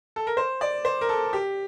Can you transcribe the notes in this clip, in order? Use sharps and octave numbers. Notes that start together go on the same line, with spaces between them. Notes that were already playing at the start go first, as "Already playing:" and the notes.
A4
A#4
C5
D5
C5
A#4
A4
G4